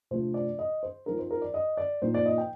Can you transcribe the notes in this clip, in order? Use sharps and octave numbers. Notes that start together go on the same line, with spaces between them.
C3 F3 A3 D4 F4 C5
D5
D#5
C5
F3 C4 D#4 A#4
C5
A#4
D5
D#5
D5
A#2 F3 C4 D#4 C5
D5
D#5
G5